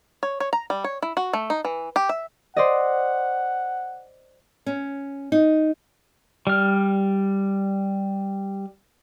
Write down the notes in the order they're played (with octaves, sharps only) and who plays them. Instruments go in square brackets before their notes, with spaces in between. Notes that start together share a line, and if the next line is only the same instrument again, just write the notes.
[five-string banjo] C#5
C#5
A#5
G3
C#5
E4
F#4
A3
D#4
E3
G4
E5
[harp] C5 D5 D#5 [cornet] F#5
[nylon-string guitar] C#4
D#4
[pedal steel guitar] G3 F6